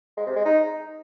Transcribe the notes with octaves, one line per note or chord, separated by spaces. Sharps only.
G#3
C3
G#3
D#4